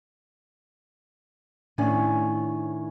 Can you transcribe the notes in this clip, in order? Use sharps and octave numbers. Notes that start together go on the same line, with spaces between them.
A2 D#3 C#4 D4 G#5